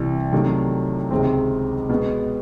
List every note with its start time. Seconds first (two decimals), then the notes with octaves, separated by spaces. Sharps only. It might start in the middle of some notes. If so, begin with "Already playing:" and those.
Already playing: C2 C3 E3
0.32 C3 D#3 F#3 A3
1.11 C#2 C3 D#3 G#3 C4
1.89 B2 G#3 B3